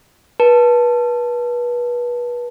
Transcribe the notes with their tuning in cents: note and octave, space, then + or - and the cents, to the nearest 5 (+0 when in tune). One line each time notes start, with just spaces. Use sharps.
B4 -30 A5 +0